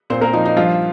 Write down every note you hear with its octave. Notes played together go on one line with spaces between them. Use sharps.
A#2 C4 C5
A#3 A#4
F3 D#4
D#4
G2 F3 F4